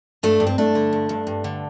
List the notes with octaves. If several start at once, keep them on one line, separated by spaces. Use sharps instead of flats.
G2 A3 D4
G2
C4
G2 A3 D4
D3
G2
G2
G2
D3